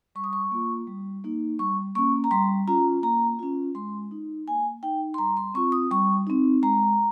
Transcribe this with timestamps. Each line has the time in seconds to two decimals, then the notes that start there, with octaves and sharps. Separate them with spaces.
0.15 G3 C#6
0.24 D#6
0.33 C#6
0.51 A#3 F4
0.87 G3
1.24 A#3 D#4
1.59 G3 C#6
1.95 A#3 C#4 C#6
2.24 A#5
2.31 G3 C6
2.68 C#4 F4 A#5
3.03 A#3 A#5
3.39 C#4 F4
3.75 G#3 C6
4.11 D#4
4.48 A#3 G#5
4.83 D#4 G5
5.14 C6
5.18 G3 A#5
5.37 C6
5.54 C4 F4 C#6
5.72 D#6
5.91 G3 C#6
6.27 C4 D#4
6.63 G#3 A#5